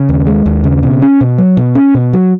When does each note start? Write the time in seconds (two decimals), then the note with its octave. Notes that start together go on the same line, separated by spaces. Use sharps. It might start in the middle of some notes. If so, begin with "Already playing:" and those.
Already playing: C#3
0.09 D#2
0.27 G#3
0.46 D#2
0.64 C#3
0.83 B2
1.02 C#4
1.21 B2
1.38 F#3
1.57 B2
1.75 C#4
1.94 B2
2.13 F#3